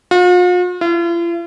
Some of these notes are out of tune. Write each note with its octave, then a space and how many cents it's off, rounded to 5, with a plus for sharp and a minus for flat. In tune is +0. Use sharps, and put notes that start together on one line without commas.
F4 +45
F4 -45